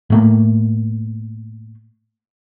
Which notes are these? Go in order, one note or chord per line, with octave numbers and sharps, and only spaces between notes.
A2 A3 A#3